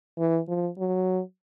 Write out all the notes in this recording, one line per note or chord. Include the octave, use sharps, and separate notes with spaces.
E3
F3
F#3